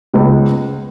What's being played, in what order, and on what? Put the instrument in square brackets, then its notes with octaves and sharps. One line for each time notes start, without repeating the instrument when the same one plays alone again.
[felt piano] C#2 C#3 G#3 B3